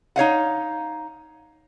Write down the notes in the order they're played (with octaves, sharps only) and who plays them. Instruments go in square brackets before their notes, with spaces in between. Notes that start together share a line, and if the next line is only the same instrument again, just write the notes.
[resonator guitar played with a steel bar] D#4 C#5 F5 F#5